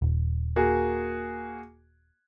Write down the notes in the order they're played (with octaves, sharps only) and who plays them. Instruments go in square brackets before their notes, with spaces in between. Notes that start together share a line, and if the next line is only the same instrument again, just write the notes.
[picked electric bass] D#1
[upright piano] A#3 F#4 G#4